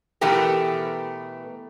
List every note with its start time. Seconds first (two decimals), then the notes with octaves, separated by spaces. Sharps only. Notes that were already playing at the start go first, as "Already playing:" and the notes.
0.21 B2 E3 A3 B3 G4 A#4